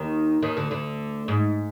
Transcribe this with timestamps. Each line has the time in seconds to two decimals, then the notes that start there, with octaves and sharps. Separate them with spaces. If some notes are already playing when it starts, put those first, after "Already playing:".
Already playing: D#2 D#3
0.42 D#2 D#3
0.57 D2 D3
0.71 D2 D3
1.28 G#2